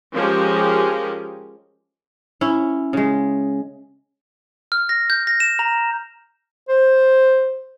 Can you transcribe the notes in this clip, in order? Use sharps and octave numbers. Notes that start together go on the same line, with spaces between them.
F3 G#3 C#4 G4 A#4
C#4 E4
C#3 G#3
F6
A#6
G6
A#6
E7
A#5
C5